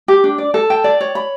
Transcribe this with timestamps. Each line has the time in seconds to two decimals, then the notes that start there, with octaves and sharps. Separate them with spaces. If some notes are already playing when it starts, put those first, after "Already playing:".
0.08 G4
0.24 D4
0.38 D5
0.54 A4
0.70 G5
0.84 D5
1.01 C#5
1.15 B5